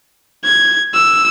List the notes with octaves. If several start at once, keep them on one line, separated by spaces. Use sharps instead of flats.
G#6
E6